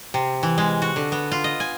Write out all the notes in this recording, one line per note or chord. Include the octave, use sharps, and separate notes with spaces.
C3
E3
G#3
F#4
D3
B3
F4
D#5
G#5